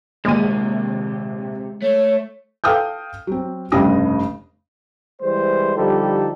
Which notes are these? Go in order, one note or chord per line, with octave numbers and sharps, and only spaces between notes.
A#1 D#2 C3 G#3 D#7
A3 C#5
A4 F5 G5 D#6 F6 G6
F#3 C4
F1 G2 C#3 G5 D#6 A#6
E3 G3 G#3 C5
D3 F3 G3 D#4 G4 A4